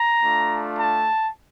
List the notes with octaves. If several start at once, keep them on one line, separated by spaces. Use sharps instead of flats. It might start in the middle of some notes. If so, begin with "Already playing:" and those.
Already playing: A#5
A3 D4 F4
A5